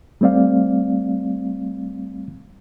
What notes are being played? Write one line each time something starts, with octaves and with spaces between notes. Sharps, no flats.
G3 A3 C4 D5 F5